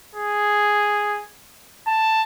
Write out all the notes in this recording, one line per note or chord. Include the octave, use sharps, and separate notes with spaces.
G#4
A5